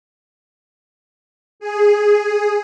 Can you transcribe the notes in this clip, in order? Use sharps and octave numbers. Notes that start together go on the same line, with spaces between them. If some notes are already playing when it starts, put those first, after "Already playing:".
G#4